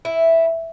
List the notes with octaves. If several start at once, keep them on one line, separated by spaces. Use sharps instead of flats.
E4